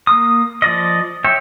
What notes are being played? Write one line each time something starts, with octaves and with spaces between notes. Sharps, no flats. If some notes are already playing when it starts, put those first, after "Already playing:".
A#3 D#6
F3 D5 D#5
C#5 E5 G5